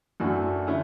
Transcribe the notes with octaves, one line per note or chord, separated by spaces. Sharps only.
F#2 E3 A3 D4 F#4
D3 A3 C#4 E4